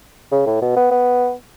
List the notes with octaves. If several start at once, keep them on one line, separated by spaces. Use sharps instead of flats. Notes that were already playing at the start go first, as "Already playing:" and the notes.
C#3
A2
B2
B3
B3